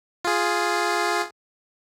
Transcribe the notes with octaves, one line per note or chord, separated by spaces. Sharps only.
F4 G#4